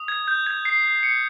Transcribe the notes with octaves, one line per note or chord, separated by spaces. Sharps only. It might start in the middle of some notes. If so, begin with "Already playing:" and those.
Already playing: D#6
G#6
G6
G#6
C7
C7
C#7